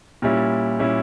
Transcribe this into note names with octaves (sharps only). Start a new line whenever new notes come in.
A#2 G3 C#4 E4
A#2 G3 C#4 E4